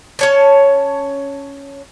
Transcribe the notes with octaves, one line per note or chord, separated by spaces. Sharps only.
C#4 C#5 A5